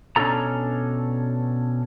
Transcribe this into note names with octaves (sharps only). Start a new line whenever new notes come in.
B2 C#4 D4 F4 A4 A#5